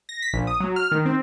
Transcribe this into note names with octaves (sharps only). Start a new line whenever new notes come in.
A#6
B6
A#1
D#6
F#3
F6
D#3
C4